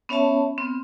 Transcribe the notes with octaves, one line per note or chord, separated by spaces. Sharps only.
B3 C#4 C#5 E5 A5
B3 C4